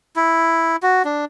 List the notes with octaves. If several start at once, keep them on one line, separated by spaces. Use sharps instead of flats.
E4
F#4
D4